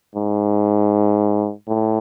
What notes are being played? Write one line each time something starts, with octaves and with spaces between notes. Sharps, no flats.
G#2
A2